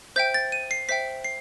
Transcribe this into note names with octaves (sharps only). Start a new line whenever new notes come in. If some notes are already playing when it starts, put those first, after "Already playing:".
C5 E5 G5 G6
A6
D#7
C7
C5 E5 G5 B6
C7